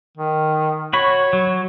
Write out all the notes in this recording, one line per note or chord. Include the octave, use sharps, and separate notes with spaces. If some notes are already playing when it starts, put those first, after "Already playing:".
D#3
F#4 C#5 B5
F#3